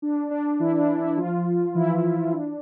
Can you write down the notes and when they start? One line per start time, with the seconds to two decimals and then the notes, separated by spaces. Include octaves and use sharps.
0.02 D4
0.31 D4
0.60 E3 E4
0.78 D4
0.98 E3 E4
1.17 F3 F4
1.75 E3 E4
2.33 D4